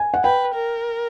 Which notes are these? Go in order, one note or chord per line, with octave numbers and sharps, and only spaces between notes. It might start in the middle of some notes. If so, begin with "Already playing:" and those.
Already playing: G#5
F#5
B4 G5
A#4